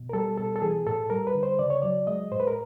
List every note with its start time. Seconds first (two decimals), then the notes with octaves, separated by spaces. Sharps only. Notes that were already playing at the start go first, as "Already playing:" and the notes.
Already playing: B2
0.09 A#4
0.13 G3 A4
0.38 B2 A4
0.56 A4
0.62 E3 G#4
0.86 A2 A4
1.10 G3 A#4
1.27 B4
1.35 D3
1.43 C5
1.59 C#3 D5
1.70 C#5
1.82 F#3 D5
2.07 G#3 D#5
2.32 A2 C5
2.40 B4
2.47 A#4